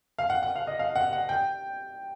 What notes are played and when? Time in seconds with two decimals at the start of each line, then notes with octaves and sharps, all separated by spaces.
0.19 F5
0.30 F#5
0.43 F#5
0.56 F5
0.67 D#5
0.79 F5
0.96 F#5
1.13 F#5
1.29 G5